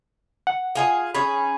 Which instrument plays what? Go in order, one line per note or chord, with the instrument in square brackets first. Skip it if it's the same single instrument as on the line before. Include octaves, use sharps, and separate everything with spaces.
[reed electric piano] F#5
[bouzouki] F4 G#4 D#5
[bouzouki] C#4 D#4 G#4 [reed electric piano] B5